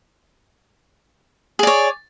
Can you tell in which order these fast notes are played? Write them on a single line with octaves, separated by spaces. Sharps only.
G#4 D5 C#5